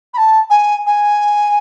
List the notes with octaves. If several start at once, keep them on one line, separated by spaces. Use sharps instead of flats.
B5
A5
G#5
G#5